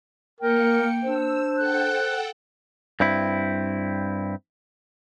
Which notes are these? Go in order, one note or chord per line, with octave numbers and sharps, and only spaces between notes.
A#3 A#4 G5 C#7
D4 C5 E6
A4 F#5 G5 F#6
G2 C4 E4